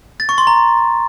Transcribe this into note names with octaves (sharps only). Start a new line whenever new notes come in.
A6
C#6
C6
A#5